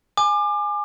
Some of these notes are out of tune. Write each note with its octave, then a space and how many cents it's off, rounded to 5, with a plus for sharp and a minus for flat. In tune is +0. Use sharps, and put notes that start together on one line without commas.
G#5 +0 D6 +30